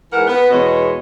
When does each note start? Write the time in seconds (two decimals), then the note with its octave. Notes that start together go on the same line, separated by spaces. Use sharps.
0.13 G#2 E3 A#4 F#5
0.28 B3
0.50 E2 B2 G#3 B3 C#5 D#5